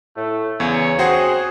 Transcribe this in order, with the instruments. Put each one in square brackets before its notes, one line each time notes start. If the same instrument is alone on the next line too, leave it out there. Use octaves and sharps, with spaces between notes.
[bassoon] A2 [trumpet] A3
[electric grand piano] E2 [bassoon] C#3 [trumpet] C#5
[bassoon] C4 [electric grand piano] F#4 C5 F#5 [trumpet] G#4